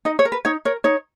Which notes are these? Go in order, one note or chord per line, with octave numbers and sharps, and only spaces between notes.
D#4 D#5
C#5
A#4
B4
D#4 C#5
A#4 C#5
D#4 C#5